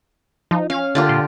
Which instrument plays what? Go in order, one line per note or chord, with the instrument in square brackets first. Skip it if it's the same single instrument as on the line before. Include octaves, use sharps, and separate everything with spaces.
[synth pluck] F3 [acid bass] D#4
[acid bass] C#4 [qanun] F5
[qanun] D3 F4 G4 [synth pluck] A#3 A6
[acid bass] A#2 [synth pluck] C6